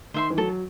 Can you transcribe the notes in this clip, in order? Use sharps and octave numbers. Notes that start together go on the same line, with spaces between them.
D#3 C5 E5 C6
E3
F#3 A4